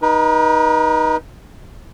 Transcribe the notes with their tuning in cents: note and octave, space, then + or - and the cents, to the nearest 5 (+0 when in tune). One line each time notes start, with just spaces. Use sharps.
D#4 +0 B4 -40